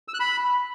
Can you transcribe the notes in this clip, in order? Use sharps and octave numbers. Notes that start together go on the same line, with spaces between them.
E6
F#6
B5